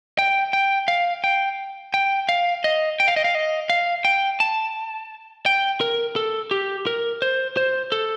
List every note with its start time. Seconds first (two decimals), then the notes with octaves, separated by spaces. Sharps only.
0.19 G5
0.53 G5
0.88 F5
1.24 G5
1.94 G5
2.29 F5
2.64 D#5
3.00 G5
3.08 F5
3.16 D#5
3.24 F5
3.35 D#5
3.70 F5
4.05 G5
4.40 A5
5.46 G5
5.81 A#4
6.16 A4
6.51 G4
6.87 A#4
7.22 C5
7.57 C5
7.92 A4